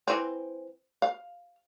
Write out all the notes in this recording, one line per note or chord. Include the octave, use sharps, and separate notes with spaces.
E3 C4
F5